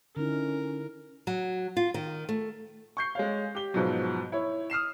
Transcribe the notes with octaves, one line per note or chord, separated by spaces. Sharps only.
D3 C#4 D#4 E4 A#4
F#3
F4
D#3
A3
C#6 G6 C7
G#3 C#5 F5
G4 G7
G#2 B2 F3 F#3
E4 C#5
D#6 F6 C7 E7